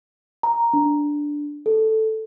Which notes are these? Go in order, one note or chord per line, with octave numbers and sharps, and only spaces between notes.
A#5
D4
A4